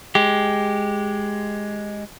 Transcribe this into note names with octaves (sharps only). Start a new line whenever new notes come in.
G#3 G4